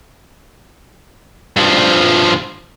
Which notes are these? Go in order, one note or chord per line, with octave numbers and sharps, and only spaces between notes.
G2 F3